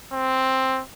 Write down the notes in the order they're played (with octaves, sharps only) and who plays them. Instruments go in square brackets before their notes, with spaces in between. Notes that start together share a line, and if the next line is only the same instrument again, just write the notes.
[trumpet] C4